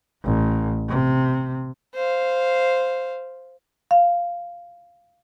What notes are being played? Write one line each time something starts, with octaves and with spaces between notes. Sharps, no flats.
A1
C3
C5 F5
F5